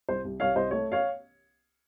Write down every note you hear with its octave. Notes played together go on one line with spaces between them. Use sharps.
C2 C5
C2
C2 C#5 F5
C2 C5 D#5
A3 C#5
C#5 F5